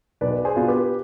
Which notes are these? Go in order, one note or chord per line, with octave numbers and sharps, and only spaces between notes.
B1 B4 D5
G#4 C5
B2 B3 D4 F4
G4 B4